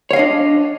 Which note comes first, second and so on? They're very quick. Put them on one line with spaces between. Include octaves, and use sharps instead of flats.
C#5 F5 D#5 D4